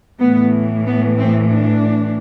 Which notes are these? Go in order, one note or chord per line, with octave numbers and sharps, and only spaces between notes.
A2 E3 B3
B3
C4
D4